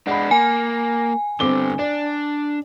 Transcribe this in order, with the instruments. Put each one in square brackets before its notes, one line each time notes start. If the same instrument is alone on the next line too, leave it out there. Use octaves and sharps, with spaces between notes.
[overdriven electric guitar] G#3 D4 [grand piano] F#5 B5
[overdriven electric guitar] A#3 [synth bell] G#5
[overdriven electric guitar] G2 D3 [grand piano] C4 D6 G7
[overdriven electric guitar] D4 [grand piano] D5